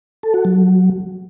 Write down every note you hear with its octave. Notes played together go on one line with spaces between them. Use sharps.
A4
F#4
F#3